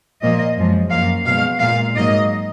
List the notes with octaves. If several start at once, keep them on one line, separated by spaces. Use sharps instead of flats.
A#2 F3 A#3 D#5
F#2 F3 G#3
F#2 F3 A#3 F5
B2 G#3 F5
A#2 G#3 F5
G#2 F#3 A#3 D#5